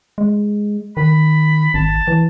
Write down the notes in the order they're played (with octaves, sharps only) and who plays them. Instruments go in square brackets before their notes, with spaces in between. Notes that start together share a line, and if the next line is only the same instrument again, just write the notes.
[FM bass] G#3
[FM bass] D#3 [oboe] B5
[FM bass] G#1 [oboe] A5
[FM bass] E3